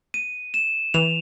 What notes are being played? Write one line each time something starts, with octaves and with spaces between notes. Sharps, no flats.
D#7
E7
E3 F7